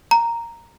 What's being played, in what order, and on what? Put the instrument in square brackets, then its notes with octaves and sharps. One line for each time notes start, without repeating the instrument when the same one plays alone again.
[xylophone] A#5